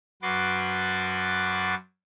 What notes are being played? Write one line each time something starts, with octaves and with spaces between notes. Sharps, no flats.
F#2 F#4 B4 C6 D6 A6